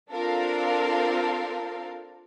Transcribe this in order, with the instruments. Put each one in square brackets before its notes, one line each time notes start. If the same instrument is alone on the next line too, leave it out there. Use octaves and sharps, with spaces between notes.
[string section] C4 D4 F4 A4 A#4 F5